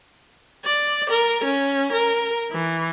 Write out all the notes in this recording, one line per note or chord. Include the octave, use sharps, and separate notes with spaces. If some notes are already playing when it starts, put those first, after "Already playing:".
D5
A#4
C#4
A#4
E3